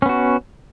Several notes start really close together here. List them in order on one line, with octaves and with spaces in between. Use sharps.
C#4 B3 F#4